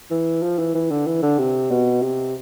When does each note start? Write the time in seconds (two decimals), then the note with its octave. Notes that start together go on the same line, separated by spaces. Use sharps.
0.11 E3
0.43 F3
0.59 E3
0.74 E3
0.91 D3
1.07 E3
1.23 D3
1.39 C3
1.71 B2
2.02 C3